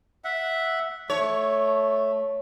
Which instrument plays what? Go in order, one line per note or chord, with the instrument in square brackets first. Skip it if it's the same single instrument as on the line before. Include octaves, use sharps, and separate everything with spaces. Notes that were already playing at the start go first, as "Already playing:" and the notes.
[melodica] E5 F#5
[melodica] A3 [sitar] C#5